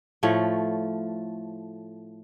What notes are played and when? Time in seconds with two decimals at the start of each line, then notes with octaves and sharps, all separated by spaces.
0.23 A2 F3 A3 C#5